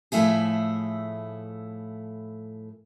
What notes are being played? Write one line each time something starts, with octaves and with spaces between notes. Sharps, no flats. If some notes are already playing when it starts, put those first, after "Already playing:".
A2 F3 A3 E4 G#4